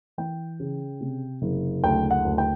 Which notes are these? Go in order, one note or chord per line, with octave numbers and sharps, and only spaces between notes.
E3 G5
C#3
C3
F#1
D2 G5
F#5
D2
G5